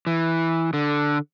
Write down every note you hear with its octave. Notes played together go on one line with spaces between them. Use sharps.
E3
D3